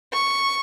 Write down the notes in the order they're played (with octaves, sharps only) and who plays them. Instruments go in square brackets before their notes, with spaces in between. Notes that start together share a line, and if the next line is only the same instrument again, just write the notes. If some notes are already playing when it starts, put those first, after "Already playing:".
[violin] C#6